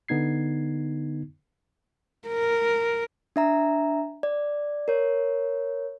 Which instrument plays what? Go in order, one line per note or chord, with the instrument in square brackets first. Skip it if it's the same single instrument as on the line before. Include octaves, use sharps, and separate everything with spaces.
[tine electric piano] D3 B3 D#4 G#6 C7
[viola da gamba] A#4
[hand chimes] D4 E5 A#5
D5
A#4 C#5